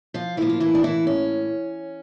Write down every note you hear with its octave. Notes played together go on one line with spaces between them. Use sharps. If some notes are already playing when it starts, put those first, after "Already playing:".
F3 F4
A2 E3 F3 A#3 E4
F4
E3 E4
D4
E3 E4
C#4